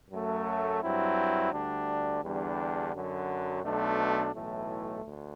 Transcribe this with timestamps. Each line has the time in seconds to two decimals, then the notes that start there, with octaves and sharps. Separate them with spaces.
0.10 F#2 F#3 A3
0.81 G2 F#3 C4 E4
1.52 D2 D3 G3 D4
2.22 E2 D3 G3 D4
2.93 F#2 D3 F#3
3.63 B1 B2 A3 D4
4.34 B1 A2 E3 A3
5.04 D2